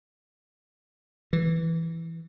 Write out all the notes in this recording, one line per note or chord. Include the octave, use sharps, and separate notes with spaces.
E3